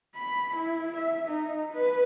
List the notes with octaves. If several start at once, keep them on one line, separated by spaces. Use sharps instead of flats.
B5
E4
E5
D#4
B4